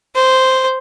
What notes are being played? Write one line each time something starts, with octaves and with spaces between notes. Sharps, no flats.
C5